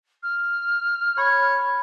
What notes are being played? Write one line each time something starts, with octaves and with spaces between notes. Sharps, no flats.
F6
C#5 B5